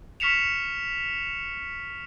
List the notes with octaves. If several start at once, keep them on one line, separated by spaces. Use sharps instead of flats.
C#6 F6 B6 C#7 E7 F7